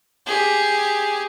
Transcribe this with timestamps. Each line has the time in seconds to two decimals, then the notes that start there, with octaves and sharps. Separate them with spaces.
0.26 G4 G#4